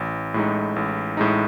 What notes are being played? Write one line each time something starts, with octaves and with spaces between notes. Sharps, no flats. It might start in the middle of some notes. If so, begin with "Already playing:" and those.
Already playing: A1
A2 G#3 D#4
A1
A2 G#3 D#4